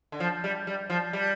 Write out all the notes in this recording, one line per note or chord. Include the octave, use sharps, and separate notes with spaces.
D3
F3
G3
G3
F3
G3